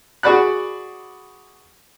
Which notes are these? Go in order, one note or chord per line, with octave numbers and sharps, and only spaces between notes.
F#4 G#4 D5 B5 F#6